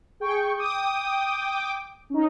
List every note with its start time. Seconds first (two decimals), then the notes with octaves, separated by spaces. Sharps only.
0.20 G#4 G5 C#6
0.57 G5 D6 D#6
2.10 C#4 D#4